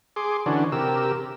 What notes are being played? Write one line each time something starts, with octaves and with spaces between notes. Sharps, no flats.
G#4 C6 D6
D3 E3 C#4 D4 F#4
C3 G4 A#4 E6